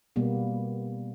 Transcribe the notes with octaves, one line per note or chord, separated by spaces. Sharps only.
B2 G3 A#3 B3